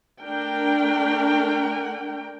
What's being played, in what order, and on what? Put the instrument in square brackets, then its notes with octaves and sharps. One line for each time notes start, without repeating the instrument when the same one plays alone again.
[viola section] A3 D4 A#4 G5